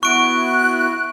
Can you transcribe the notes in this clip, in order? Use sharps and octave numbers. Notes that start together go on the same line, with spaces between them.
B3 E4 F#4 C#6 F#6 D7